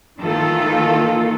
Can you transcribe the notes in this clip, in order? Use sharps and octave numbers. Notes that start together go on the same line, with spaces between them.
D#3 E3 A#3 F4 A4